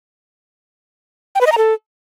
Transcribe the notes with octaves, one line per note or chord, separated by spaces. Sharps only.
G5
B4
D#5
A#5
A4